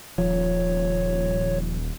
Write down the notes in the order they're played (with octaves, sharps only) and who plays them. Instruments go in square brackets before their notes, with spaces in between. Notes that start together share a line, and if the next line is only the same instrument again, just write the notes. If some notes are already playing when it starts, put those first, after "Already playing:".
[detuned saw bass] D#1 [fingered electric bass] F3 [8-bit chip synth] C#5